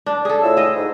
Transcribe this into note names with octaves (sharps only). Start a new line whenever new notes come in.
D4
G#4 A4
A2 F4 E6
G#4 D#5
G#2